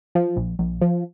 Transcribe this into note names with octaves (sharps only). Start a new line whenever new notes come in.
F3
A#1
A#1
F3